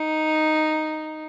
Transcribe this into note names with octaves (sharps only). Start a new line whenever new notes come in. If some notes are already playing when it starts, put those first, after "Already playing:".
Already playing: D#4